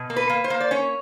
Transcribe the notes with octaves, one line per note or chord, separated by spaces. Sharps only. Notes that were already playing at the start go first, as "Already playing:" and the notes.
Already playing: B2
A#3
B4
A#3
C5
A#3
D5
C#4 C#5